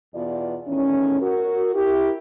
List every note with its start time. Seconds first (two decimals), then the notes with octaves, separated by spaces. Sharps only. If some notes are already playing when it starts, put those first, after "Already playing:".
0.14 E2 B2 B3 F4 D5
0.68 E2 A2 D#3 C#4
1.21 F#4 A#4
1.74 E4 G4 A#4